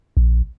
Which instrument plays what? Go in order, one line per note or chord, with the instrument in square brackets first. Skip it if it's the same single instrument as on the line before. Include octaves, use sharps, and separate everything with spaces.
[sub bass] A#1